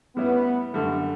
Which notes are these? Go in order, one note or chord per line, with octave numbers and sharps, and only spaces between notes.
A2 G3 B3 C#4 E4
F#2 D3 G3 A3